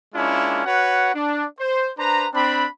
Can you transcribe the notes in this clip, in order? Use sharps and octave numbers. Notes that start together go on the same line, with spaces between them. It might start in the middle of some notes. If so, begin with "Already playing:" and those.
G#3 A#3 C#4 D4 E4 F4
F#4 B4 C#5 F#5
D4
C5
D4 B4 C5 A#5
C4 D4 B5